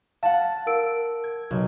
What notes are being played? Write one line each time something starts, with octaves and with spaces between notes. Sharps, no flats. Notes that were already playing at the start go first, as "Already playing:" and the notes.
F5 F#5 A5
A#4 E6 D7
G#6
B1